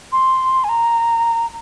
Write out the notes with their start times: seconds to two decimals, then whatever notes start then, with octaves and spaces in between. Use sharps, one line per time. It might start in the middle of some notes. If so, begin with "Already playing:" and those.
0.12 C6
0.64 G#5
0.69 A#5